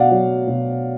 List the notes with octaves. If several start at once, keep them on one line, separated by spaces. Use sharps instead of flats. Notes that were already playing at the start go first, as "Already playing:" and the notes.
Already playing: B2 D5 F5 F#5
F#3
B2